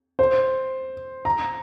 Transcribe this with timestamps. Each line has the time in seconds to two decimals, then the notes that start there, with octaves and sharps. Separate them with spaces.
0.19 C5
1.25 A#5